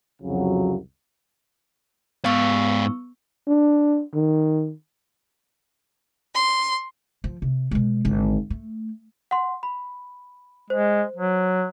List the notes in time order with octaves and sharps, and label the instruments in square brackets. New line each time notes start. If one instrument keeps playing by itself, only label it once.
[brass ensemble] C2 F2 C#3 F#3
[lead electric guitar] G#2 F5 [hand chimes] B3 C#6 E6
[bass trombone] D4
D#3
[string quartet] C6
[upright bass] F3
C3
B2 G#3
G#1 D3
A3
[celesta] F#5 C6
B5
[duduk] G#3 [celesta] C5
[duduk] F#3